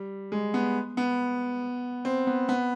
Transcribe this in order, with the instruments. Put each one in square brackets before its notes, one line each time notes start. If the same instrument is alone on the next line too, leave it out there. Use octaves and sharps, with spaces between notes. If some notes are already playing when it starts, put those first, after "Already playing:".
Already playing: [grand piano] G3
G#3
B3
B3
C4
B3
B3